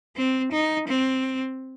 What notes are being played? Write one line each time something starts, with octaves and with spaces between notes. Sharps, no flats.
C4
D#4
C4